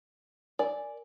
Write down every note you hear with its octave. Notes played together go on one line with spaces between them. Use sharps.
A#4 D5 G#5